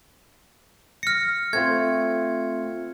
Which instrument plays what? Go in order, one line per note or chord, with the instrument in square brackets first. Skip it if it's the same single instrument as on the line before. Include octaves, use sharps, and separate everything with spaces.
[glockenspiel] F6 C#7 [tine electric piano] A#6
[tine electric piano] A3 C4 F4 [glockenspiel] G#6